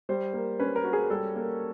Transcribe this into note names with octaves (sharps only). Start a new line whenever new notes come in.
G3 C5
A#3
C#4 B4
A#4
F#4
G#4
G3 A4
A#3